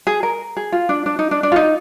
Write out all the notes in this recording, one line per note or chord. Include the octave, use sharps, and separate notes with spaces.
G#4
A#4
G#4
F4
D4
D4
D#4
D4
D4
F4
D#4